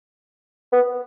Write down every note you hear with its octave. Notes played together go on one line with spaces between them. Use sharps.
B3